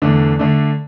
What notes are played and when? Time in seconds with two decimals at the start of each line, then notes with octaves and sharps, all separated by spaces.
0.02 E2 D3 A3 D4
0.39 D3 A3 D4